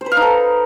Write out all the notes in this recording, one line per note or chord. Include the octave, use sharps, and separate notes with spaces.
C5
B4
F5
D#4
A4